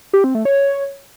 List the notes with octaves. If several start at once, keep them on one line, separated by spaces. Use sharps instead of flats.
G4
C4
A3
C#5